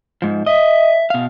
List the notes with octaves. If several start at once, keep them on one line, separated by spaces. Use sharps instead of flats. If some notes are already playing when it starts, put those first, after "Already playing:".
G#2 F3
D#5 E5
B2 F5